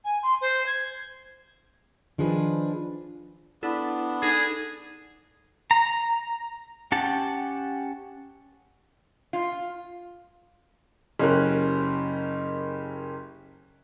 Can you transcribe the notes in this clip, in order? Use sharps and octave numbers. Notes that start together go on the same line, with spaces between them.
G#5
C6
C5
G#6
D#3 F3 D4 G#4 B4
B3 D4 E4 A4
D#4 G#4 A4
A#5
C#4 G4 F#5 A5
F4
F#1 C#4 G4 A#4 F#6